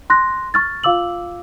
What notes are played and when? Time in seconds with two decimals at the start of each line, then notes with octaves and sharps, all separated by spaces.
0.10 C6 F#6 A#6
0.54 C#6 F6 A6
0.84 F4 F5 D6 E6 F#7